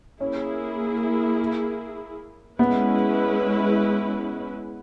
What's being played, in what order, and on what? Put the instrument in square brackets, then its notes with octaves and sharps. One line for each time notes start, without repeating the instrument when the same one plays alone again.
[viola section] A#3 E4 G#4 [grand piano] C#4
[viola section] G#3 C#4 E4 B4 [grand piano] B3